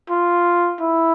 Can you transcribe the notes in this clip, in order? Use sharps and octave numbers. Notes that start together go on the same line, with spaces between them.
F4
E4